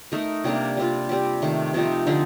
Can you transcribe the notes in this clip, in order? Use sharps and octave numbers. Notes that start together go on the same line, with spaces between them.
A3 D#4 A#4
C3 G3 A#3 D4
G3 C4 F4
G3 C4 G4
C3 D#3 A3
C3 F3 C4 D#4
D3 F3 C4 D#4